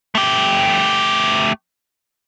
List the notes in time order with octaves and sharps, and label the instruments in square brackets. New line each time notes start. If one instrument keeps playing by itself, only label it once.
[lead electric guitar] A3 G4